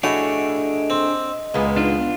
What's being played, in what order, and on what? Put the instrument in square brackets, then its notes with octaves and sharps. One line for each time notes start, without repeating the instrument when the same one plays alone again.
[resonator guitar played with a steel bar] A2 A3 F#4 [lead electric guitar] D4 G#4 [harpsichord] C#5 [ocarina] D#5
[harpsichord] C4
[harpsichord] C#2 [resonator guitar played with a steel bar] A#2 G#3 B3
[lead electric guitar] D4 F4 [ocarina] D#4
[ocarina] B3